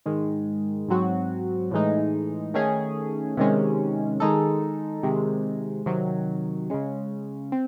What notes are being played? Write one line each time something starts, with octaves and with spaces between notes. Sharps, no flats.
G#2 D#3 G#3
G#2 F#3 C4 F#4
A2 E3 G#3 D#4
D#3 A3 C#4 G#4
C3 D#3 G#3 C#4
D#3 G#3 D#4 A4
C3 D#3 G#3
C3 D#3 F#3
C#3 G#3 C#4
C4